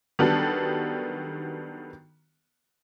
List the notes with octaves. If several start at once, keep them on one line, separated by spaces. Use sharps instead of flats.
D#3 F#3 G3 B3 D4 A4